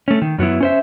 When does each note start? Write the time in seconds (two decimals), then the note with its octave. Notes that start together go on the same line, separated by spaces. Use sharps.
0.08 A3 C#4
0.22 D#3
0.38 F#2 F#3 B3 E4
0.60 C#4 C5 E5